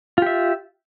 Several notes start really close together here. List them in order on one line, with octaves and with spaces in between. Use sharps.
F4 G4 E5